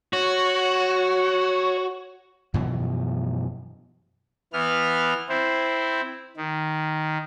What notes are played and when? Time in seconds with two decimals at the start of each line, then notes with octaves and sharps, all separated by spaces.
0.13 F#4 C#5
2.54 F#2 B2 E3 F3
4.53 E3 B3 F6
5.29 C4 E4 C5
6.37 D#3